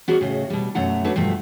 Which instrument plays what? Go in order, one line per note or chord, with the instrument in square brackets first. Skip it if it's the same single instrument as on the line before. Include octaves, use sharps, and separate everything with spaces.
[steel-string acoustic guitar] B3 F#4 G#4 A#4 D#5
A2 C#3 D#5
B2 G3
F#2 B2 A3 F#5 A#5
F#3 A3 D4 F#4 B4
G2 B2 F3 A3